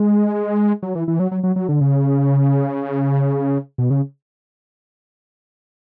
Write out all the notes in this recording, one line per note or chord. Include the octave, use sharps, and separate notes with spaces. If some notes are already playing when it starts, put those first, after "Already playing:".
Already playing: G#3
F#3
E3
E3
F#3
F#3
F#3
F#3
D3
C#3
B2
C#3